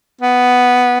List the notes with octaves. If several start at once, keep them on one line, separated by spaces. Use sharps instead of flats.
B3